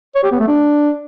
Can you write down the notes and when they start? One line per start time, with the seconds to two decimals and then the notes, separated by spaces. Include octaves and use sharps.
0.15 C#5
0.23 G4
0.32 B3
0.40 A3
0.48 D4